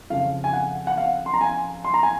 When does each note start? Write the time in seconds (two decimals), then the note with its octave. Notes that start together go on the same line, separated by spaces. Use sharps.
0.10 F2 C#3 F3 F5
0.44 G#5
0.53 F#5
0.87 F#5
0.97 F5
1.26 C6
1.34 A#5
1.41 G#5
1.84 C6
1.94 A#5
2.03 G#5